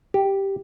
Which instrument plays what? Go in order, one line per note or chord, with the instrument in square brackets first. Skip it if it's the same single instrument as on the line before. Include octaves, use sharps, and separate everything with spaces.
[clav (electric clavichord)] G4